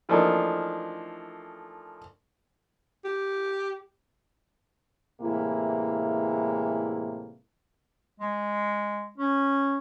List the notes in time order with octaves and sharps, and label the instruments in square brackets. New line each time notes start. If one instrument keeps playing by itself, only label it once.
[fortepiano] E3 F3 A3 A#3 D4 D#4
[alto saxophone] G4
[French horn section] A2 C3 E3 G#3 A#3 E4
[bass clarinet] G#3
C#4